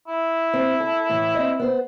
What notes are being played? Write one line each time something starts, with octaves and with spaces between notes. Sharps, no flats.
E4
C4
A4
A2 E3
C4 D#5
B3 C5